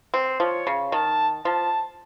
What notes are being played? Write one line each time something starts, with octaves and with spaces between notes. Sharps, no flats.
C4
F3 C#5
C#3
D#3 A5
F3 A5